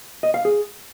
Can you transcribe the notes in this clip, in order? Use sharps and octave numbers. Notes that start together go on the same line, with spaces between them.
D#5
F5
G#4